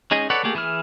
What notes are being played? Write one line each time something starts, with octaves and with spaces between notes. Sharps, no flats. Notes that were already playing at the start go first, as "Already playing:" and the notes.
G#3 C#4 D#4 G#4 D#5
A4 B4 C#5 D5 F#5
A3 A#3 G4 G#4
E3 E4 G#4 F6